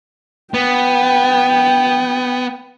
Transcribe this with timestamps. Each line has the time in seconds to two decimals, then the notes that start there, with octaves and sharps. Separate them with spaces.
0.54 B3 G5